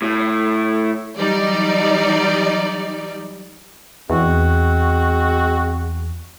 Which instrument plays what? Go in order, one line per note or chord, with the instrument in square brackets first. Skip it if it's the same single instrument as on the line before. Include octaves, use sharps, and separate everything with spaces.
[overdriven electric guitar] A2
[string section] E3 F#3 G3 D#4 D5
[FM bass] E2 [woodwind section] G#3 C4 F#4